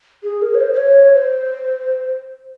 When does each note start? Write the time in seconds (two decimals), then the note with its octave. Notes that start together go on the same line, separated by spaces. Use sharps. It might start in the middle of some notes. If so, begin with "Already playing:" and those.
0.23 G#4
0.42 A#4
0.55 C#5
0.60 C5
0.74 C5
0.77 C#5
1.14 C5